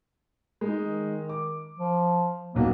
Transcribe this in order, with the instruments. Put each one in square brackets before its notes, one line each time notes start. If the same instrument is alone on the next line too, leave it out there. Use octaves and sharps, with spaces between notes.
[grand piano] G#3 D#4
[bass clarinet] D#3
[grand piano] D6
[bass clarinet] F3
[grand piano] D#1 B1 F#4 [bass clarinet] A#3